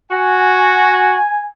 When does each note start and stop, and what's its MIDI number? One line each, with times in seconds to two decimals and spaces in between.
0.11 1.16 66
0.11 1.48 80